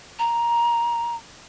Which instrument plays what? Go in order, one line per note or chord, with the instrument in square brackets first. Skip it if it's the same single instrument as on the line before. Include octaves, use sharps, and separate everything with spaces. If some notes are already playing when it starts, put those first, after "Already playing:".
[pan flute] A#5